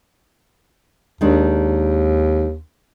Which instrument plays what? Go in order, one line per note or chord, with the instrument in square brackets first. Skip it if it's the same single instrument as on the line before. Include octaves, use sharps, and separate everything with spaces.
[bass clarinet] D#2 [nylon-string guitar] D#3 G#3 D4